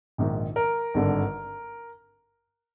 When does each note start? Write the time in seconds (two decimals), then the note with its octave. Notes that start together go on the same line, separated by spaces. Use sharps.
0.18 A#1 G#2 D#3
0.56 A#4
0.94 G#1 G2 D3